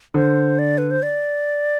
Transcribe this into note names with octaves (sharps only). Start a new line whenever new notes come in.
D3 C5
D5
B4
C5
D5